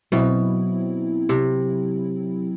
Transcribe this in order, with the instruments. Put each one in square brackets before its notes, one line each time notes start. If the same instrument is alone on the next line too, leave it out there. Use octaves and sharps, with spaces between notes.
[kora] B2 [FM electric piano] F#3 C4 E4
[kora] C3